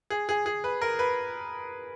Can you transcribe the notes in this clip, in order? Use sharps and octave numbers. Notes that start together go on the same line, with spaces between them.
G#4
G#4
G#4
B4
A#4
B4